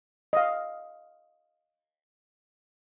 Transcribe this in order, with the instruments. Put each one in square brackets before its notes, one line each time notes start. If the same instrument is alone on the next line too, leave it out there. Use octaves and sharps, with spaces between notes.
[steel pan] D#5 F5